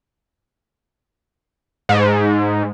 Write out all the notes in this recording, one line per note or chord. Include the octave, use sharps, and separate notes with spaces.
G#2